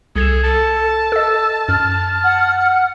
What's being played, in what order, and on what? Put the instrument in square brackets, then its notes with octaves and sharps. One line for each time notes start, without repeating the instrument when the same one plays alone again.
[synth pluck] C2 G#6 E7 [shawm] G#4 [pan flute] A4
[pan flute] A4 [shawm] A5
[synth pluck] A4 D#5 [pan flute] E6
[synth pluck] F#2 [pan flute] F6
[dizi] F#5